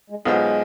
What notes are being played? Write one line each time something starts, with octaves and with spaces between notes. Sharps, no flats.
G#3
B1 B2 G#3 B3 F4 C5